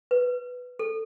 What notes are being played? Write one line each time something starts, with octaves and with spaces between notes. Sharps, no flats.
B4
A4